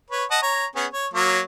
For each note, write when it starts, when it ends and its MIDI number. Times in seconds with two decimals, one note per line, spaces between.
0.10 0.25 71
0.10 0.25 73
0.31 0.39 75
0.31 0.39 78
0.31 0.39 81
0.42 0.65 73
0.42 0.65 82
0.76 0.86 59
0.76 0.86 61
0.76 0.86 68
0.93 1.07 73
1.14 1.40 54
1.14 1.40 58
1.14 1.40 73